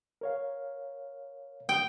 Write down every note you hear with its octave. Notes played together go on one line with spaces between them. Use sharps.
A#4 C#5 F5
G5 D#6